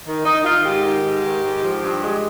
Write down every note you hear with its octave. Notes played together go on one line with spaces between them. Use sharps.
D#3
D#3 D#4
D#3 F4
G#2 G4
D#3
G#2
D#3
G#2
F3
G2
G#3